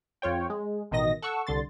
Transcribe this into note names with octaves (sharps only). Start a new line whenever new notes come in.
F2 F4 C#5 G5
G#3
A1 B2 D#3 D#5 A#6
A4 F#5 C#6 E6
C2 D3 C6 A6